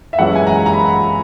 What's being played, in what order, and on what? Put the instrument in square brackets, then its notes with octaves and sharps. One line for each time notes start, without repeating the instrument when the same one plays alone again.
[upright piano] E5
F#2 E3 G#3 C#4 F#5
G#5
A#5
A#5
B5